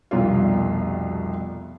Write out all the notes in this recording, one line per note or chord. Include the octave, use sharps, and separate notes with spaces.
F1 C2 B2 F4